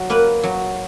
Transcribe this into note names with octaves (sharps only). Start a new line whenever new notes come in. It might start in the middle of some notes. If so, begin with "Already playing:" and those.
Already playing: F#3
A#3 B4
F#3